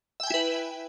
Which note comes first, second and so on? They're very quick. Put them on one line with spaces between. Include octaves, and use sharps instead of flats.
E5 G5 G#5 E4 B4